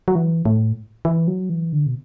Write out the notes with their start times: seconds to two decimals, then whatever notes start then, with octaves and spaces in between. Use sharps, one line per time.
0.08 F#3
0.15 E3
0.45 A2
1.05 E3
1.28 F#3
1.50 E3
1.73 D3
1.87 B2